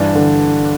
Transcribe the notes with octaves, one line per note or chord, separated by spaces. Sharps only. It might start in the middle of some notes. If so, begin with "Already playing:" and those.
Already playing: G2 E3 D4
D3